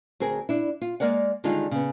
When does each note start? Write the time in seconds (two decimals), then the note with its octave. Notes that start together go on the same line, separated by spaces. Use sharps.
0.20 D2 C4 G#4 A#4
0.49 D4 E4
0.82 F4
1.00 G#3 A#3 A#4 D5 F#5
1.44 D3 D#3 G3 G#3 D#4 F4
1.71 C#3 B3